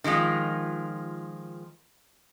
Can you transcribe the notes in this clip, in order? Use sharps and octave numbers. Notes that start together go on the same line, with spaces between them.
D#3 F3 G#3 F4